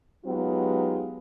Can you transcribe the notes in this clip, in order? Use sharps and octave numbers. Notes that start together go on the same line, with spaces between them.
F#3 G#3 B3 D#4 F4 G4